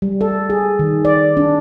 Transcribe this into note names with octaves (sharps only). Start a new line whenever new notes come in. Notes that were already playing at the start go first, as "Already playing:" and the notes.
G3
A4
G#4
D#3
D5
D4